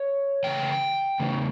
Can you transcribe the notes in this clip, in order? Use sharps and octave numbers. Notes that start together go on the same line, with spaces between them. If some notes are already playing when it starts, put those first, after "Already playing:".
Already playing: C#5
C#3 E3 A3 C#4 G5
C#3 E3 A3 C#4